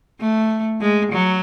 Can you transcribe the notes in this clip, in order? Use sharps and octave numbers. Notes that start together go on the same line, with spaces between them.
A3
G#3
F#3